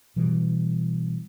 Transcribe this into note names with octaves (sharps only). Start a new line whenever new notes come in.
B2 E3 G3